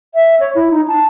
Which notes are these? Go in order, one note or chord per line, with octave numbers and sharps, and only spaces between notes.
E5
C#5
E4
D#4
A5